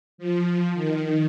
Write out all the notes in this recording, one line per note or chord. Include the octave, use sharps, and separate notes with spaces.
F3
D#3